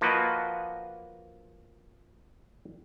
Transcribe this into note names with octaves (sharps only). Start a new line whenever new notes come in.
F3 A#3 F4 F#4 B4 D#5